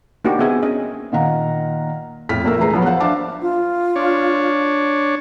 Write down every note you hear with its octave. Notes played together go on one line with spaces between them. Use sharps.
A#3 D4 D#4 F#4 G4
B3 C4 G#4 E5 G#5
C#4 D#5
A#2 D#3 F5 F#5 A#5
F2 A2 F6 B6
A#1 A3 A#3 A#4 E6
D2 E3 G#3 B4 A#5 C7
F3 F#3 B3
C5 F5 F#5 F#6
D4 C5 E5 F5 A5 D6
F4
D4 C#5